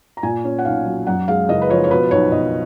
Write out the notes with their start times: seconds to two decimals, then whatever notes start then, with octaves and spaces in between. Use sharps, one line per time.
0.17 A#5
0.23 A#2 G#5
0.44 C#4
0.59 F#5
0.65 B1 F5
0.86 F#3
1.07 F#2 F#5
1.28 G#3 F5
1.49 F#1 D#5
1.62 B4
1.70 F3 C#5
1.84 C#5
1.91 B2 B4
2.11 B1 C#5
2.32 B1 D#5